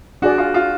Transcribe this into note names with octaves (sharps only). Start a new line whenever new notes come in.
D4 F#4 G#4 D5
F4
F4